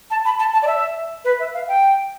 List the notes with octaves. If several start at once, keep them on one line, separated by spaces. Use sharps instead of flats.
A5
B5
A5
A5
D5
E5
B4
E5
F5
G5